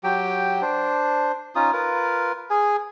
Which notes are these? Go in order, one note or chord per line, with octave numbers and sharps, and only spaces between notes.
F#3 G4 G5
D4 C5
C#4 D#4 F4 D#6
F4 A#4 B4
G#4 G#5